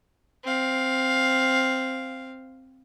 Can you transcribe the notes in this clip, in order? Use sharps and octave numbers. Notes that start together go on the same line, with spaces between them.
C4 F5